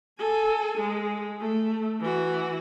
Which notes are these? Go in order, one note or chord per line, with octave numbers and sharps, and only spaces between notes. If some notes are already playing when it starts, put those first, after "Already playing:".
A4 G#5
G#3
A3
E3 F#4